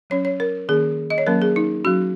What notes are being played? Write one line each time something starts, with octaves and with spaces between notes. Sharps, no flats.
F#3 C#4 C#5
C#5
A#4
D#3 A#3 C#4 G#4
D#5
C#5
F#3 A#3 C#4 A#4
G#4
D#4
F#3 C#4 F#4